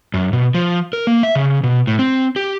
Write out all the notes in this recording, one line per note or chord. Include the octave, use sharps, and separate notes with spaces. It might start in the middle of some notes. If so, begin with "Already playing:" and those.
F#2
B2
F3
A#4
A#3
E5
C#3
B2
A2
C4
G4